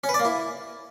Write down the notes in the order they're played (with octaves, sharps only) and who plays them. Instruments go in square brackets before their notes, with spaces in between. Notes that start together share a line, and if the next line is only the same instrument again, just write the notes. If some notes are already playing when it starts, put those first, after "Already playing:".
[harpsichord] C#4
B4
D5
A#3
E4